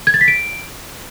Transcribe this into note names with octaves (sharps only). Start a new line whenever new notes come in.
G#6
A6
B6
D7